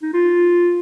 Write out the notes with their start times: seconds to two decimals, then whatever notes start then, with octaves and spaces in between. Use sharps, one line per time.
0.02 D#4
0.14 F4